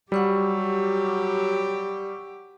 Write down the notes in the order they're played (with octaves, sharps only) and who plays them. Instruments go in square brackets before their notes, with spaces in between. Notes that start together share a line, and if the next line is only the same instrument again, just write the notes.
[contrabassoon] F#3 [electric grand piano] G3 [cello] G4 [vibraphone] F#5 C#6 E6